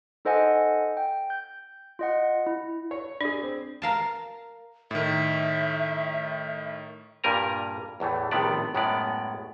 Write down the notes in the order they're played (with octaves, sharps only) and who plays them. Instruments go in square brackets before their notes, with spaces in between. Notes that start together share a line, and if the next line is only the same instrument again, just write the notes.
[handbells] D#4 A4 C5 D#5 F#5 G#5
G5
G6
F4 D#5 F#5
E4
[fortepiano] C#5
[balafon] D4 [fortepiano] G#4 D5
[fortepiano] C4
[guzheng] A#4 F5 A5
[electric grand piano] A2 D#3 [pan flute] E5
[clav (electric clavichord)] G2 A#2 G3 A#4 G#5 A#5
E2 A2 E3 A3
A#1 A2 C3 D#3 B3 D5
F#2 A2 G#3 B3 C#4 D5